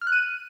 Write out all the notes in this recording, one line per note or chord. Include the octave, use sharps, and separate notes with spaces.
F6
F#6
D#7